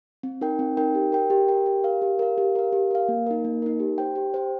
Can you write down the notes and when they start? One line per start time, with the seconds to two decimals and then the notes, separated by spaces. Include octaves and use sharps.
0.23 C4
0.41 D#4 A#4 G5
0.59 C4
0.77 D#4 A#4 G5
0.95 G4
1.12 A#4 G5
1.30 G4
1.48 A#4 G5
1.66 G4
1.84 A#4 F5
2.02 G4
2.19 A#4 F5
2.38 G4
2.55 A#4 F5
2.72 G4
2.91 A#4 F5
3.08 A#3
3.27 D#4 A#4
3.44 A#3
3.62 D#4 A#4
3.80 G4
3.98 C5 G5
4.16 G4
4.34 C5 G5